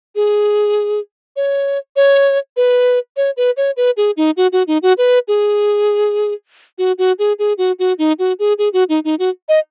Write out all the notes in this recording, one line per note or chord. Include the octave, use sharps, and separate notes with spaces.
G#4
C#5
C#5
B4
C#5
B4
C#5
B4
G#4
D#4
F#4
F#4
D#4
F#4
B4
G#4
F#4
F#4
G#4
G#4
F#4
F#4
D#4
F#4
G#4
G#4
F#4
D#4
D#4
F#4
D#5